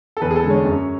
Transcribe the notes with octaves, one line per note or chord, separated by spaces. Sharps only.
A4
E2 B4
G#4
A4
D3 G#3
C#5
F#2